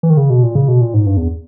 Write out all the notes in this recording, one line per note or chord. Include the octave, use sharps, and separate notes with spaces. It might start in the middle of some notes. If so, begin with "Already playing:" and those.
E3
D#3
C#3
B2
A#2
C#3
B2
A#2
G#2
G2
E2